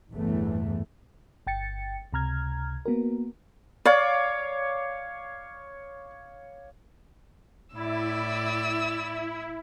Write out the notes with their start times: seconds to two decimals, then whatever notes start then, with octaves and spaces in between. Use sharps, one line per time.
0.13 G1 E2 A2 E3 A3
1.47 G1 G5 A6 C#7
2.13 C#2 C3 A#5 F6 G#6
2.86 A#3 B3 F#4 A#4
3.85 C#5 D5 F5 D6
7.75 A2 E4 D5 E6